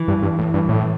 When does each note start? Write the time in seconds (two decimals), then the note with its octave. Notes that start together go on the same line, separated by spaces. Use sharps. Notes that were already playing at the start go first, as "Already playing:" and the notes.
Already playing: E3
0.08 G2
0.22 G2
0.39 A2
0.54 G2
0.69 A2